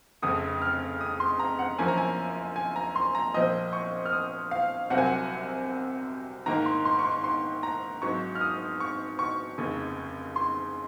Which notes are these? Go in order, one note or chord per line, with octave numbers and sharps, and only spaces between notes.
F1 F2 C#3 D#6
F6
D#6
C6
A#5
F#5
F#2 F3 A#3 C#4 G#5
A#5
G#5
G#5
A#5
C6
A#5
C2 A#2 F3 C4 D#5
C#6
F6
D#6
F5
C2 C3 F#3 C4 F#5
G#5
F#5
G#2 D#3 A#3 A#5
C6
C6
C#6
C6
C6
A#5
G#1 G#2 F#3 C#6
F6
D#6
C#6
C#6
F1 D#2 C#3
C6